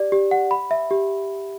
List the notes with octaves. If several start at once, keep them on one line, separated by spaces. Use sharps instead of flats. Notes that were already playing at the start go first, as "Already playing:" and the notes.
Already playing: G4 D5
G4
F#5
B5
E5
G4